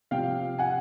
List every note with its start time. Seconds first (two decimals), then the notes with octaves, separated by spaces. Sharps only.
0.11 C3 F3 F5 G5
0.58 F#5 G#5